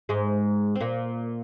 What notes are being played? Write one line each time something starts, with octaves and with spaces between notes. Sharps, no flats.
G#2 G#3
C4
A#2 A#3